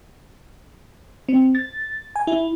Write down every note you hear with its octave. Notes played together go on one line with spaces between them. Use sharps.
C4
A6
G#5
E4